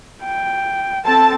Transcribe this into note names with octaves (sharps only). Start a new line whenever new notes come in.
G5
C4 A4 A5